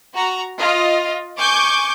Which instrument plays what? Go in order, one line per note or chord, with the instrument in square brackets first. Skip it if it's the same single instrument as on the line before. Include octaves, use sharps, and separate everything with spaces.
[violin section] F#4 A#5
F4 D#5
G#5 C#6 D6 G6